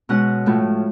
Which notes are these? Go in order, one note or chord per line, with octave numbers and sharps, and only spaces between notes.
B2 G#3 C#4 F#5
A2 F3 A3